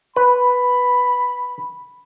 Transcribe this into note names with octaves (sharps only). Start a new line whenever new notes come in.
B4 B5